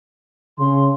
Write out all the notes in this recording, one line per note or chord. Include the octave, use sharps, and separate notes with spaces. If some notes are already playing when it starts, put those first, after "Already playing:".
C#3 C6